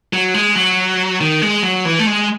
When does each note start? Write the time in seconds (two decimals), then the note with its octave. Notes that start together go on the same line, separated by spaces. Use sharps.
0.13 F#3
0.34 G#3
0.55 F#3
1.21 D#3
1.42 G#3
1.63 F#3
1.85 E3
1.99 A3
2.06 G#3